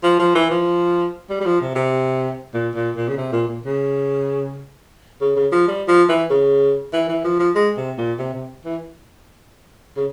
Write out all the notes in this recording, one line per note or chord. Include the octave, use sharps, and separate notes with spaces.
F3
F3
E3
F3
G3
G3
F3
C3
C3
A#2
A#2
A#2
C#3
C3
A#2
A#2
C#3
C#3
C#3
F3
G3
F3
E3
C#3
E3
E3
F3
F3
G#3
C3
A#2
C3
C3
E3
C#3